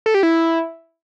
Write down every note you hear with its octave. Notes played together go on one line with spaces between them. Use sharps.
A4
G4
E4